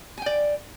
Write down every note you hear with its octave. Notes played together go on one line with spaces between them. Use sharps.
D5 G5 G#5